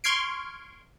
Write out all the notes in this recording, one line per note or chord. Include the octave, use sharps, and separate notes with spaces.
C6 C#6 F6 G#6 C7 D7